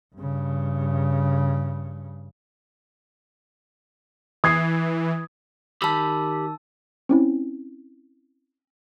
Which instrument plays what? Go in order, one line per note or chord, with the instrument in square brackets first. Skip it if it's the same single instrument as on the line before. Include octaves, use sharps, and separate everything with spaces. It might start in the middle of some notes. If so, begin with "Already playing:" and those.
[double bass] G2 C#3
[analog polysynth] E3 [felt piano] D#6 G#6 C7
[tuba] D#3 [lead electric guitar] G4 B5 [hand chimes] A5 E6
[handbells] C4 C#4 E4